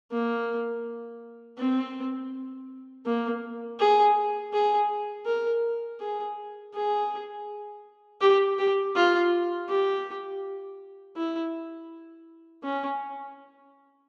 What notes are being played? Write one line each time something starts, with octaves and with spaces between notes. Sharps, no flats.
A#3
C4
A#3
G#4
G#4
A#4
G#4
G#4
G4
G4
F4
G4
E4
C#4